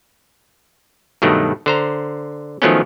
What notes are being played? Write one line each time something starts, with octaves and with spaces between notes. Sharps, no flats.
G2 B2 D#3 F#3 A3
D3 C5 A#5
D#3 F3 F#3 A3 B3 C#4